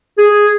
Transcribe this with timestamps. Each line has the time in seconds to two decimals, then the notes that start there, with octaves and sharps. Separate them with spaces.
0.18 G#4